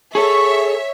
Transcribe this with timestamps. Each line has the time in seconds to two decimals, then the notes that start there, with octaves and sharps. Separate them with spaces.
0.15 G#4 A4 C#5 E5 C#6